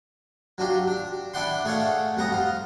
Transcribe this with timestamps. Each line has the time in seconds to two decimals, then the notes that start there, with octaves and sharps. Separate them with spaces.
0.58 F#3 D4 F4 G4
0.87 D4
1.34 D4 E4 D5 F#5 G5 C6
1.65 A3 G#4 A4 C#5 F5 F#5
2.17 F2 G3 F#5 A#5 D#6
2.32 F4